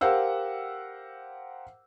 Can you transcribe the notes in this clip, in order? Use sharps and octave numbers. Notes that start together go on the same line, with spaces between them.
G4 A#4 C5 F5 F#5 E6